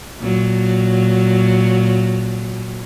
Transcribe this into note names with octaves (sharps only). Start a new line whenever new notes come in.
A#2 F#3